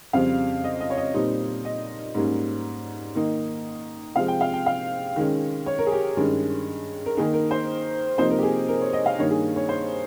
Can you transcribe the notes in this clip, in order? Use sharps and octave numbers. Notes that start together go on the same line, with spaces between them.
F2 C#3 G3 C4 F5
D#5
D#5
C#5
D#5
A#2 G3 C4 D#4
D#5
G#2 G3 A#3 C#4
D#3 A#3 D#4
C3 F3 G#3 F5
G5
F5
G5
F5
D#3 G#3 C#4
C#5
A#4
G#4
G4
G2 D#3 G#3 C#4
A#4
D#3 A#3 D#4 G#4
A#4
C5
C3 F3 A#3 D#4 C5
A#4
G4
G#4
A#4
C#5
D#5
F5
G2 D#3 A#3 D#4 C#5
G#4
C#5
C5